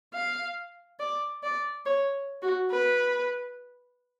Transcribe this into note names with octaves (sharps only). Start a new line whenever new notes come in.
F5
D5
D5
C#5
F#4
B4